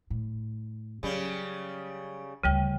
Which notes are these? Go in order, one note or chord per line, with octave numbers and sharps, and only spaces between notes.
A2
C#3 F#3 G3
D2 C#3 F3 G3 G5